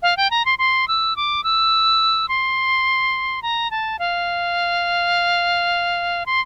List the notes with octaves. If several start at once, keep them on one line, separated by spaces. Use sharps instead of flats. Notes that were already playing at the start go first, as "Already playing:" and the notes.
F5
G5
A#5
C6
C6
E6
D6
E6
C6
A#5
A5
F5
C6